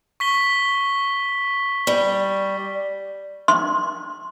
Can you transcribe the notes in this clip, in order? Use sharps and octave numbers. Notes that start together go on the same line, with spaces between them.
C#6 B6 G7
G3
C6